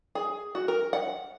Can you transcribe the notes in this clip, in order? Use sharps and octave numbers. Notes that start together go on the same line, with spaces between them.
G#4
F#4
A#4
F#5